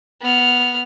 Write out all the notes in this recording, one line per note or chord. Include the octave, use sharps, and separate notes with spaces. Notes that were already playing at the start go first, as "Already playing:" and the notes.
B3 F6